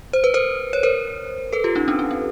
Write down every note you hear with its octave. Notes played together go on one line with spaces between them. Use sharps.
C5
B4
A#4 C5
C#5
A#4 C5
A4 B4
F4 G4
C#4 D#4
C4 D4
C#4
C4